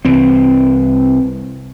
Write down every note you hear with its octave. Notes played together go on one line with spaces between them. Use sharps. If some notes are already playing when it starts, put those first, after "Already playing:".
C2 E3 C4